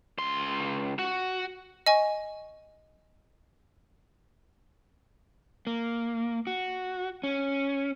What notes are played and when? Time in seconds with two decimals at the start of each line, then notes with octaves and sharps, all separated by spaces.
0.18 C#2 C6
0.99 F#4
1.86 D#5 G#5 C#6
5.67 A#3
6.47 F#4
7.23 C#4